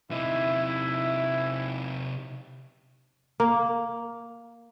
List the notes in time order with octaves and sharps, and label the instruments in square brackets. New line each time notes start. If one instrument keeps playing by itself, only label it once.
[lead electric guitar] C3 D#4 [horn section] E4
[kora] A#3